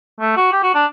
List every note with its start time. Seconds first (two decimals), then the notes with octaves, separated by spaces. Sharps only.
0.20 A3
0.36 F#4
0.52 G4
0.63 F#4
0.74 D4